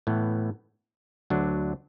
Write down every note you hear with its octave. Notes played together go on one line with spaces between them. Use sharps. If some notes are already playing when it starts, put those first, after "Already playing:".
A2 E3 B3
D2 D3 F#3 D4